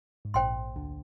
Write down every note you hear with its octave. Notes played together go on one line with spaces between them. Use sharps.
G#2
A#1 A#2 C5 G5 C6
D2 D3